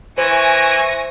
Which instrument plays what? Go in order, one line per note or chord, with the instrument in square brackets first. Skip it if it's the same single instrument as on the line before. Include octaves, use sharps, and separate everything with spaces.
[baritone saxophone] E3 [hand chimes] C5 [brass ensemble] E5 [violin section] G#5 C#6 A#6